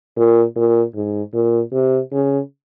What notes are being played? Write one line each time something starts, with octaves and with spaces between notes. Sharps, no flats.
A#2
A#2
G#2
A#2
C3
C#3